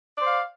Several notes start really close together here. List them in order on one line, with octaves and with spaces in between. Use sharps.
D5 C5 F5